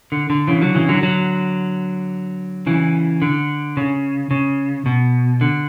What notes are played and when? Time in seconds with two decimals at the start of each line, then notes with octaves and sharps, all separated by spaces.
0.12 D3
0.30 D3
0.47 C#3 E3
0.61 D3 F#3
0.75 C#3 E3
0.88 D3 F#3
1.03 D3 F#3
2.66 C#3 E3
3.22 D3
3.77 C#3
4.31 C#3
4.86 B2
5.41 D3